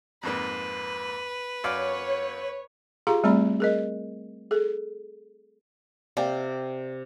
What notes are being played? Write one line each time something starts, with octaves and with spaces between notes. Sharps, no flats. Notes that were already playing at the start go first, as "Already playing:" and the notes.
F2 G#2 A#3 B4
F#2 C#5 D5 F5
F4 G4 G#4 F5 A#5 C6
G3 A3 C4 D5 A#5 B5
G#4 A#4 D#5
G#4 A4
C3 D5 F5 G5